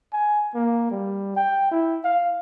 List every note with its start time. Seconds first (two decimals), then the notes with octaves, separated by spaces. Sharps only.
0.13 G#5
0.55 A#3
0.91 G3
1.37 G5
1.72 E4
2.05 F5